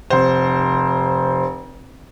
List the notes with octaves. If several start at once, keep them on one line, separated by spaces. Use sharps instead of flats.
F1 C5